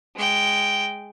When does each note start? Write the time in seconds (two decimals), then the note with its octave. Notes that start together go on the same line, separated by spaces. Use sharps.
0.17 G#3 G5